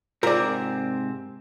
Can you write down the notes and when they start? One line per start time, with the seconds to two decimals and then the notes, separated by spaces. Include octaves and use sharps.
0.23 G#2 C3 C4 F4 A#4 D5